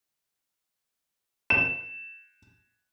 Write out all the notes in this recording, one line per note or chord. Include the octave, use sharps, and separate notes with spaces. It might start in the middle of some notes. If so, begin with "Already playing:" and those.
E7